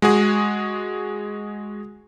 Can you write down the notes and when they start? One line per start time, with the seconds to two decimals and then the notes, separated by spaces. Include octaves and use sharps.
0.02 G#3 F#4 G#4